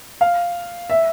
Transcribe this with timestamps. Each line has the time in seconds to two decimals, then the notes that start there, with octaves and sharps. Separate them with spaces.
0.21 F5
0.90 E5